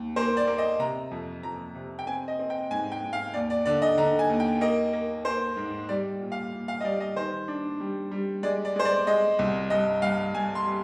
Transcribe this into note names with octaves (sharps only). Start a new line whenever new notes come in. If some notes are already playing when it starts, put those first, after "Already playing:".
Already playing: D#2
A#3 C5
D5
A#3
D#5
C3 A#5
F2
F2 A#5
C3
G5
C4 G#5
D#5
C4
G5
G#2 G#5
G5
G#2
F5
D#2 D5
D5
D3 D5
D#5
D3 A#5
G#5
D#2
G5
A#3 D#5
A#3
A#3 C5
G#2
G3 D5
A#2
F5
A#2
F5
D#5
G3 D5
D#5
D#3 C5
D4
G3
G3
G#3 D5
D5
G#3 C5
D5
G#3 D#5
C2
G2 D#5
G2 F5
G2 G#5
C6
G3